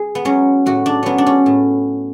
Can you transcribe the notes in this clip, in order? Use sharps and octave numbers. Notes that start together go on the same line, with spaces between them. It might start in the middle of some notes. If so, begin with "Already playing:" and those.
Already playing: G#4
B3
F#3 C#4
A2 F#4
D4
F#3 B3 C#4
D4
C#4
A2